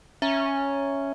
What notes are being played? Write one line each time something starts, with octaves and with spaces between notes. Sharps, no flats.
C#4 E5 A#5